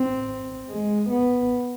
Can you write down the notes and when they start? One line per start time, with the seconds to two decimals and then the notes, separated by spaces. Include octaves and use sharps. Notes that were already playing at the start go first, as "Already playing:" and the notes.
Already playing: C4
0.69 G#3
1.10 B3